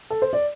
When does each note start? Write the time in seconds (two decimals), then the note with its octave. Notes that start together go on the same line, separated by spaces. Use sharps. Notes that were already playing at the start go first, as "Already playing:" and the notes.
0.10 A4
0.22 C5
0.33 D5